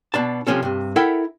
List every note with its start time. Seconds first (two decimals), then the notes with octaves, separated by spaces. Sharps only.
0.14 B2 D4 A5
0.47 C2 C3 F3 C#4 A4
0.63 G2 C3
0.96 E4 A4 A#4 E5 F#5 G5